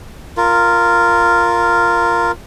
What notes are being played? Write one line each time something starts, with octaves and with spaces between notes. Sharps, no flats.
F4 A#4